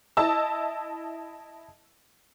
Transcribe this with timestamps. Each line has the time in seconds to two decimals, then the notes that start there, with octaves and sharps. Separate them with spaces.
0.17 E4 D#5 A5 E6